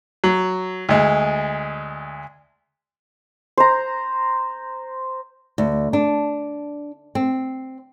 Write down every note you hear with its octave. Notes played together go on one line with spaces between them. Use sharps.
F#3
D2 G#3
C5 A#5
D2
D4
C4